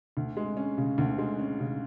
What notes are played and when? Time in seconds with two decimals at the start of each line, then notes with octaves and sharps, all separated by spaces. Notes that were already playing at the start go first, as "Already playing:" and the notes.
0.17 D2
0.37 G#3
0.57 C#4
0.78 C#3
0.98 D2
1.18 G#3
1.39 C#4
1.60 C#3